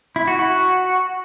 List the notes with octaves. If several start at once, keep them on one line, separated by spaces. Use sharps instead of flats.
E4
F#4
F#4